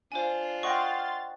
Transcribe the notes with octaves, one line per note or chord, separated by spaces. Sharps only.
D4 F4 C5 G#5
D#5 F#5 G5 C6 C#6 F6 A6 A#6